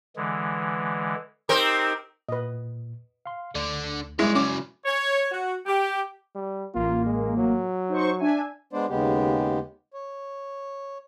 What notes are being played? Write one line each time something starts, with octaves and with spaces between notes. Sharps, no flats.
D3 E3 G#3
C4 D#4 G4 A#4
A#2 B4 D#5
F5 C6
D2 D3 D4
G3 G#3 E4 C#5 D5
C#3 F#3 C#4 D5 G#5 C#6 D6
C#5
F#4
G4
G3
A1 A#3 F4
G#3
F#3
D#4 C5 C#6
D4 E5 G#5
G#3 B3 D4 C5 D5
D#2 C#3 G#3 B3 G4
C#5